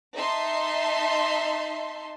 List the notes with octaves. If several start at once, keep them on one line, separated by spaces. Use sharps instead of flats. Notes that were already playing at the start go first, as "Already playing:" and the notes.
D#4 E5 A5 C6